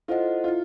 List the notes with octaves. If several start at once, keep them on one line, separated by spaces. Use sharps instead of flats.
E4 F4 A4 C5 D#5 F#5
F4
E4